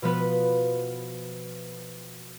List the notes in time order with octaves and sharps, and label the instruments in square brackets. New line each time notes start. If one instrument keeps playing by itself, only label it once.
[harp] B2 F3 B3 B4